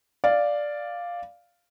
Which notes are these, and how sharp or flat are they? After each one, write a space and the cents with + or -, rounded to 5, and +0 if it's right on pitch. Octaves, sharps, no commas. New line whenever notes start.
D5 +0 F5 +0